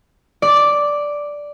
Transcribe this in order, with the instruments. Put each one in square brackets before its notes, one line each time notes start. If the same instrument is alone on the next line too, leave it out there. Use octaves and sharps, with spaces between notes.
[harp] D5